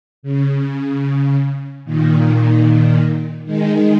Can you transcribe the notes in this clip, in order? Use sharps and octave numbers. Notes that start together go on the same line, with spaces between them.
C#3
A#2 D#3
D#3 G#3